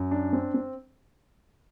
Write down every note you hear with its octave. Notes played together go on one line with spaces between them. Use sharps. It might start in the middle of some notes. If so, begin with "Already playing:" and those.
Already playing: F#2
D4
C4
C4